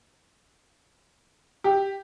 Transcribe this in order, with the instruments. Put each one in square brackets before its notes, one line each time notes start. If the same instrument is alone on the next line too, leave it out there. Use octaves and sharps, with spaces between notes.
[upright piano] G4